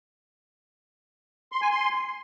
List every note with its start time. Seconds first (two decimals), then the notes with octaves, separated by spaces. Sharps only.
1.52 C6
1.62 G#5
1.71 C6